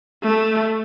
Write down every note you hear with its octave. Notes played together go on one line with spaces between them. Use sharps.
A3